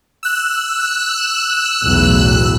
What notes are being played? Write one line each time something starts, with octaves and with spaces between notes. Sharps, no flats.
E6 F#6
B1 E2 A2